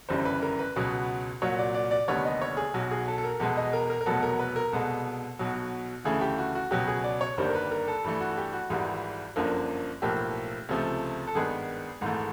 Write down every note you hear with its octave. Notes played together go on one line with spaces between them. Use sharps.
G1 F#2 C#3 E3 G3 C5
B4
A#4
B4
C#2 B2 F#3 B3
C2 A#2 F#3 C#5
D5
D5
D5
F1 D#2 D3 G3 B3 C#5
D#5
C#5
G#4
B1 B2 F#3
G#4
A4
A4
A#4
E2 B2 G#3 B3 A4
D#5
A#4
A#4
A#4
F1 E2 B2 F#3 B3 A4
A#4
B4
A#4
C2 B2 G#3 B3 A4
B1 B2 F#3
D2 C#3 E3 A3 G#4
G4
F#4
F#4
C#2 B2 F#3 B3 G4
G#4
D5
C#5
G1 G2 D#3 G3 A#3 C5
A#4
B4
A#4
A4
G2 E3 A3
F#4
F#4
G4
F#4
G#1 G#2 E3 G3
G1 F#2 D3 F3 A#3
B1 A2 F3 A#3 G4
C#2 C3 F3 A3
A4
G#1 G2 D#3 G#3 B3 G#4
G#1 G#2 E3 A3